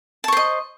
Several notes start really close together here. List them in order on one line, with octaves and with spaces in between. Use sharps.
A5 C#6 C5 D#5